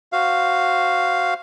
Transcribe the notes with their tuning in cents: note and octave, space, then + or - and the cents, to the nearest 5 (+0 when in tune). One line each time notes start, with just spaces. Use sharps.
F#4 +0 C5 +0 F5 +0